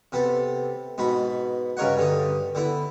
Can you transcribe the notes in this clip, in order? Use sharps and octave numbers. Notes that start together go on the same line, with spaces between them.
C3 B3 A4
G#2 B2 B3 B5
G2 C#3 A#4 C#5 D#5 F#5
G2 D3 D#6
D3 B3 E4